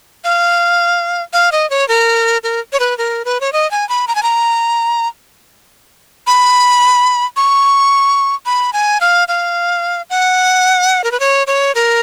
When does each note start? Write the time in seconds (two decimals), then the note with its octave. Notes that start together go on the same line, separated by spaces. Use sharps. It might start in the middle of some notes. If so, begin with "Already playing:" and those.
0.24 F5
1.33 F5
1.52 D#5
1.70 C#5
1.88 A#4
2.43 A#4
2.73 C#5
2.80 B4
2.98 A#4
3.25 B4
3.41 C#5
3.53 D#5
3.71 G#5
3.89 B5
4.08 A#5
4.15 G#5
4.23 A#5
6.27 B5
7.37 C#6
8.46 B5
8.73 G#5
9.01 F5
9.28 F5
10.10 F#5
11.04 A#4
11.12 B4
11.20 C#5
11.47 C#5
11.75 A#4